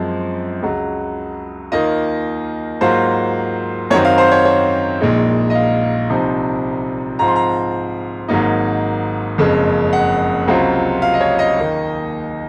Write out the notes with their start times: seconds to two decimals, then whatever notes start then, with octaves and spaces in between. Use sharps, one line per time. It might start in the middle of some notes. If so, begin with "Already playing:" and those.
Already playing: F#2 F3 G#3 C4
0.62 C#2 C#3 F#3
1.72 D#2 D#3 A#3 F4 D#5
2.81 G#2 F#3 A#3 F4 C5
3.90 F#2 D#3 F#3 C4 C#5
4.05 F5
4.18 C5
4.32 C#5
4.45 C#5
5.01 A#1 A#2 G#3 D#4
5.50 D#5
5.55 F5
6.09 C2 C3 F3 C4 D#4
7.19 G#2 F3 C4 F4 A#5
7.28 C6
7.36 A#5
8.28 G#1 G#2 F#3 A#3 D#4
9.38 F#1 F2 C#3 G#3
9.93 F#5
10.48 C#2 C3 F#3 C4 F4
11.02 F5
11.14 D#5
11.21 C#5
11.39 D#5
11.57 D#2 D#3 A#3 D#4